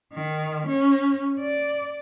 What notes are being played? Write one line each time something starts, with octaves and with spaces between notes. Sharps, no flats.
D#3
C#4
D5